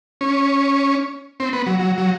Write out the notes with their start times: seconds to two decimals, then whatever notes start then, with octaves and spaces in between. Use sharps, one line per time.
0.21 C#4
1.40 C4
1.53 B3
1.66 F#3
1.79 F#3
1.98 F#3